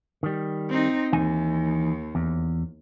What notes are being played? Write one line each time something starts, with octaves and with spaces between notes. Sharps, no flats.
D#3 G3
C4 D#4
D#2 E3 D#4 G#5
E2